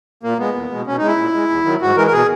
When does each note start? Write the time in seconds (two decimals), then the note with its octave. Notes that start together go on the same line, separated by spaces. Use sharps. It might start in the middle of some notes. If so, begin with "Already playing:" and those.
0.23 A#2 A#3
0.39 G#3 B3
0.55 E2
0.71 B2 G#3
0.87 B2 C#4
0.98 G#3 D#4
1.07 E4
1.18 A#2
1.34 G#3
1.50 E2
1.65 D#3 F#3
1.82 G#2 F#4
1.96 E3 G#3 A#4
2.07 A#4
2.13 B2 G#4